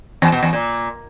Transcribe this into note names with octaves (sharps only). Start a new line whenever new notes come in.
E2
B2
E2
A#2